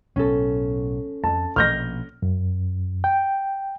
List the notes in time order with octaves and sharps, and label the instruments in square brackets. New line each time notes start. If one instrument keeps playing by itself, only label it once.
[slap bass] B1 A2 [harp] C#4 A4
[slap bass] F2 [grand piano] A5
[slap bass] A#1 B2 [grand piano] F6 G6 A#6
[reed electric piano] F#2
G5